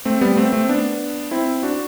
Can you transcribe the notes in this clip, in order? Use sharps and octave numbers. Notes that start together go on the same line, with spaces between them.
A3 C4
G3 B3
A3 C4
A3 C4
B3 D4
C4 E4
D4 F#4